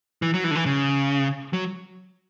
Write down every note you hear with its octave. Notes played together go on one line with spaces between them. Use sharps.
E3
F#3
E3
D3
E3
C#3
F#3